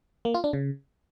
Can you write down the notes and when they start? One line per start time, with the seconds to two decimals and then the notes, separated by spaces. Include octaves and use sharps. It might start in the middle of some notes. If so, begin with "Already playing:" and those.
0.25 A#3
0.34 F4
0.44 D4
0.53 C#3